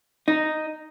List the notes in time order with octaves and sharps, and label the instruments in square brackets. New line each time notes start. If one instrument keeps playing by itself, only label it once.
[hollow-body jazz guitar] D#4